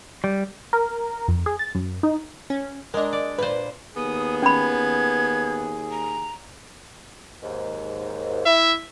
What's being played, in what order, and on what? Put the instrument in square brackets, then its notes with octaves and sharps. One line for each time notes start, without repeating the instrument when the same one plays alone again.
[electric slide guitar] G3
[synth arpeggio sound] A#4
F2
G#4
A6
F#2
D#4
[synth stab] C#4
[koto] G#3 D4 [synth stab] A#4 D#5
[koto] D5
[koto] A#2 C5 [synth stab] B4
[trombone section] D#2 G#4 [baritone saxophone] B3 [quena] D#6
[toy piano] C#4 B5 [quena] G#6
[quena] A#5
[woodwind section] D#2 G#2
[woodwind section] E4 [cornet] E5